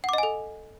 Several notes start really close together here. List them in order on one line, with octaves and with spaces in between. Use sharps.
F#5 D6 D#5 G#5 A4